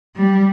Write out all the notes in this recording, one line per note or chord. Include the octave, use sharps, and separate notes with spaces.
G3